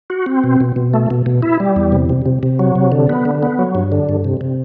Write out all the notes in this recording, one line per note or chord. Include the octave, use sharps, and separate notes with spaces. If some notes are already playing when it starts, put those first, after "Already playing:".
F#4
C4
B2
B2
B2
A3
B2
B2
E4
G3
E2
C3
C3
C3
C3
F#3
C3
D3
B3
D3
B3
F#3
G2
D3
G2
C3
C3